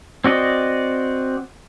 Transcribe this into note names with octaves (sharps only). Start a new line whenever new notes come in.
C4 F#4 D5 D#5